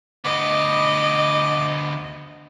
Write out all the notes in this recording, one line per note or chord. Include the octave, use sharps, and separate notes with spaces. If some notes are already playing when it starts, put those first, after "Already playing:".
D2 B3 D#5 D6